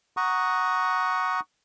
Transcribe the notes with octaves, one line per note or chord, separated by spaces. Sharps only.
F#5 A#5 C#6 D#6